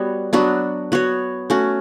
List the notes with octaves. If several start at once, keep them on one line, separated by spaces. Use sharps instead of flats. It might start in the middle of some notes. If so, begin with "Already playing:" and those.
Already playing: G3 B3 F#4 C#5
F#3 B3 D4 F#4
B3 F#4 C#5
A3 C#4 F#4